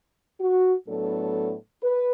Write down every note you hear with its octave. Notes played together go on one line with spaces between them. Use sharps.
F#4
A2 F#3 B3 D4 A4
B4